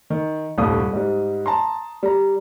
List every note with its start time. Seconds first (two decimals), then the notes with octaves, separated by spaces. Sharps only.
0.10 D#3
0.58 D#1 C2 G2 A3 D#6
0.93 G#2 G3
1.46 A5 A#5 C6
2.03 G3 A#5